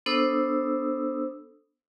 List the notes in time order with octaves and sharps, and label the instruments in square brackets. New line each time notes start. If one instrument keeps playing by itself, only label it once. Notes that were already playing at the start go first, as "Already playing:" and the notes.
[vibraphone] B3 D4 A4 C5 D#6 E6